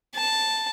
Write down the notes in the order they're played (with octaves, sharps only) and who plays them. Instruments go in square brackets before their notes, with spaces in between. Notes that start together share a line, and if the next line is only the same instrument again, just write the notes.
[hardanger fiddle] A5